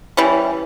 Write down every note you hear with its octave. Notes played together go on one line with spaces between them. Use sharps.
E3 G3 C#4